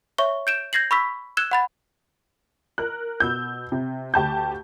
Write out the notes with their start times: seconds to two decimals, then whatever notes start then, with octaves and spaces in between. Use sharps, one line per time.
0.18 C#5 E5 C#6 G7
0.47 G6 D7 E7
0.73 G6 G#6 A#6 C7 F#7
0.91 B5 C#6 E6 B6
1.37 E6 F#6 G#6 E7 G7
1.51 F#5 B5 A6
2.78 A#4 F#6
3.20 B2 E6 G6
3.72 C3
4.14 D2 G4 A5 G6